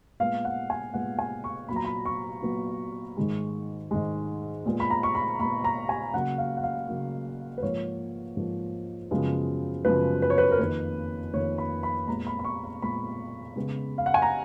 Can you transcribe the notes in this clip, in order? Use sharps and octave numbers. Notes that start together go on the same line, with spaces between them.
A#2 G#3 B3 F5
F#5
G#5
A#2 G#3 B3 F#5
G#5
C#6
A#2 F#3 B3 B5
A#5
B5
C#6
A#2 F#3 B3
G#2 D#3 G#3
G#2 D#3 G#3
A#2 G#3 B3
B5
A#5
C#6
B5
A#2 G#3 B3 B5
A#5
G#5
C#3 F#3 A#3 F#5
F5
F#5
F5
C#3 F#3 A#3
B4
G#2 F3 A#3 C#5
G#2 F3 A#3
F#2 C#3 F3 G#3 B3
F#2 C#3 F3 G#3 B3 B4
B4
C#5
B4
A#4
F2 D#3 A#3 B4
F2 D#3 A#3 C#5
B5
B5
A#2 G#3 B3 A#5
B5
B5
C#6
B5
A#2 G#3 B3 B5
C#3 G#3 B3
F5
F#5
G#5
A#5